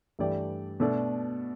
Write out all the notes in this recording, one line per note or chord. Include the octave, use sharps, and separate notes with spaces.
G2 E3 A3 G4 D5
B2 A3 D4 A4 D5